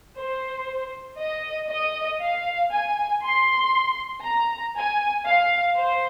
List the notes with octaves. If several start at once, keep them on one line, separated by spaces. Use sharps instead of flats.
C5
D#5
D#5
F5
G#5
C6
A#5
G#5
F5
C5